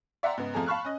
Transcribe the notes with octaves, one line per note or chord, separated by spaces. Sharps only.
D5 E5 F#5 G5 A#5 C6
G#2 C#3 B3
F2 F3 A3 G#4 A#5
F5 A5 B5 C#6 F6 F#6
C#4 D#5